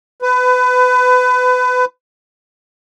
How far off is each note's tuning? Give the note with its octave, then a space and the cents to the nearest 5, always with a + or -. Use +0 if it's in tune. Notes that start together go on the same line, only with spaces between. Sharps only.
B4 +25